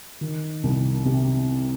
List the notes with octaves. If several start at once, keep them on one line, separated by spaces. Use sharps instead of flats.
D#3
C2
C3